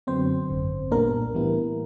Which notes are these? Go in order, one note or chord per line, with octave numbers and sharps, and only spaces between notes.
F#2 D3 F#3 B3 C4 C5
G#1 F#2 D3
C2 A#2 G3 A#3 B3 D4 A#4
A2 E3 G3 B3 E4